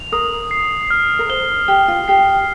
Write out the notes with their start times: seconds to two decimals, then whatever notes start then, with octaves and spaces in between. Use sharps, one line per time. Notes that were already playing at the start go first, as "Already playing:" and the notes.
Already playing: F7
0.12 A#4 D#6
0.51 C7
0.90 F6
1.19 A#4
1.29 C5 G7
1.68 G4 G7
1.88 F4
2.08 G4 C7